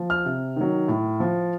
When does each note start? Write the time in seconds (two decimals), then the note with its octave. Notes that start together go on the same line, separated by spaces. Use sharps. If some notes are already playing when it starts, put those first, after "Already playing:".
Already playing: F3
0.10 F6
0.25 C3
0.56 D#3 F#3
0.88 A2
1.20 F3